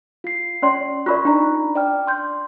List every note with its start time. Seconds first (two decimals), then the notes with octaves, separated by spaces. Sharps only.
0.24 F4 C7
0.62 C#4 C#5 D5 C6
1.06 F4 A#4 D5 B5 C#6 F#6
1.25 D4 D#4 A#5
1.75 D5 G5 F6
2.07 C6 G6